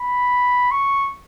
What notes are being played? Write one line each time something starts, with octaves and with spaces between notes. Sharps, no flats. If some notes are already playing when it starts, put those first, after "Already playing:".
Already playing: B5
C#6